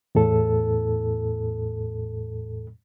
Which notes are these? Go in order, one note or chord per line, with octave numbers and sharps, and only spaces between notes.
E2 A2 A4